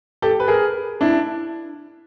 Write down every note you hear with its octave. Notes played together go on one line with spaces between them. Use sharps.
G4 A4
B4
G#4 A#4
D4 E4